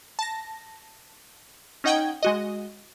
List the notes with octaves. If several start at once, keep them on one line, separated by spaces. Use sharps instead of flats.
A5 A#6
C#4 D#4 D#5 F#5 G5 G#6
G#3 F#4 D#5